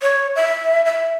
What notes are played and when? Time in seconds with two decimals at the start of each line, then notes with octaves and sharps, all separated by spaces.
0.02 C#5
0.36 E5
0.86 E5